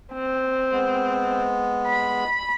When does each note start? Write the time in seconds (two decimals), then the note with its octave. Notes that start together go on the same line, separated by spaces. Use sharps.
0.13 C4
0.72 G#3 B3
1.86 B5